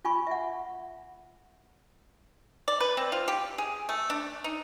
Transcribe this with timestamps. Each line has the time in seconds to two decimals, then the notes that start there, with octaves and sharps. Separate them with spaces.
0.05 F4 G#5 B5 C#6
0.27 E5 F#5
2.68 D5
2.80 B4
2.97 C4
3.12 F4
3.28 G4
3.58 G#4
3.89 A3
4.10 D4
4.44 D#4